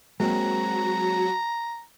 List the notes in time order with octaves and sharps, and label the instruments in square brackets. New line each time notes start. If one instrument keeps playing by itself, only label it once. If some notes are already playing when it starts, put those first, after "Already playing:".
[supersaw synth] F#3 F#4 [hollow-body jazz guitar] G#3 A#3 C4 [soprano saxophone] A#5